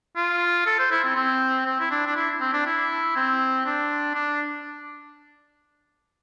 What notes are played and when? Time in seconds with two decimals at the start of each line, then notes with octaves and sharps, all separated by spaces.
0.16 F4
0.66 A4
0.79 C5
0.91 E4
1.04 C4
1.16 C4
1.66 C4
1.80 E4
1.91 D4
2.06 D4
2.16 E4
2.40 C4
2.53 D4
2.66 E4
3.16 C4
3.66 D4
4.15 D4